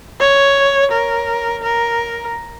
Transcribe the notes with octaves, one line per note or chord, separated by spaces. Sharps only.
C#5
A#4
A#4